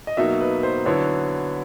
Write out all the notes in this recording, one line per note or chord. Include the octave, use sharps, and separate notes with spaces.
D#5
B2 F#3 A#3 D#4 E5
B4
C5
D3 F#3 B3 E4 C#5